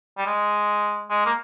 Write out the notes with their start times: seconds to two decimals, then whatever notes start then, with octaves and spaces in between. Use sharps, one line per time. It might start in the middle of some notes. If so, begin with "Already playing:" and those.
0.18 G3
0.26 G#3
1.10 G#3
1.26 A#3